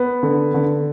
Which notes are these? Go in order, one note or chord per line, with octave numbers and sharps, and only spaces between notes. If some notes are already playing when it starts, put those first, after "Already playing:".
Already playing: B3
D3
D3